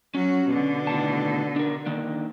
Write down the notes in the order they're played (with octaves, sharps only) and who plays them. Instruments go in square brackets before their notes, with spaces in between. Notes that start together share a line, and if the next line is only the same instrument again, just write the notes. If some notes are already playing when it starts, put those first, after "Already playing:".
[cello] F#3 F#4 [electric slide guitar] C#4
[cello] B2 D3
[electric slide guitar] A2 D#3 A5
D4 A#4
D#3 A#3 D4